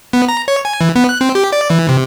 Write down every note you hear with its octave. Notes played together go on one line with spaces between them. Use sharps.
B3
A#5
C#5
G#5
E3
B3
F#6
C4
G4
D5
E3
C3